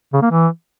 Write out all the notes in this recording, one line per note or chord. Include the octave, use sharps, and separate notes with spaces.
C#3
A#3
E3